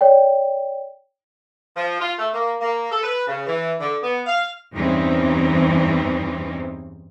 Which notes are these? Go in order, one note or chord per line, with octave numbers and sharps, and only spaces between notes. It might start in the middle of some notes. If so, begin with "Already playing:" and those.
C#5 D5 G5
F3
F4
A3
A#3
A#3
A4
B4
C#3
E3
D3
B3
F5
E2 G2 E3 C4 C#4 D#4